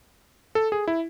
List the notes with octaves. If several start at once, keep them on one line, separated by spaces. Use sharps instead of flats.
A4
G#4
E4